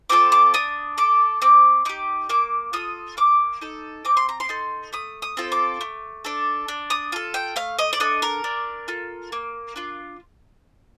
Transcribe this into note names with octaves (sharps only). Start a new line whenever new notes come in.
C4 F4 A4 D6
D6
D4 D#6
A4 D6
C4 D6
D#4 G4 D6
A#3 D6
F4 A4 D#6
A#3 D6
D#4 A4
C4 D6
C6
A#5
C6
D#4 A4
A3 D#6
D#6
C4 F4 A4
D6
A3
D4 A4
D4
D#6
F4 A4
G5
A3 F5
D#5
D5
D4 A4 D#5
A#4
D4
F4 A4
A#3
D4 F4